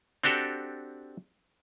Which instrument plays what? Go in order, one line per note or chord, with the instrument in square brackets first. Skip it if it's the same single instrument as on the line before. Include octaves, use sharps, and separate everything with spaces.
[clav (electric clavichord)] C4 D4 F#4 G4 A4